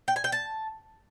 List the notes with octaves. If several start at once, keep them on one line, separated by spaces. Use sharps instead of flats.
G5
G#5
G5
A5